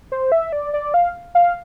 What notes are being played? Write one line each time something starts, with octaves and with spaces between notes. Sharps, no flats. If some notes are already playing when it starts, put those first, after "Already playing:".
C5
E5
D5
D5
F5
F5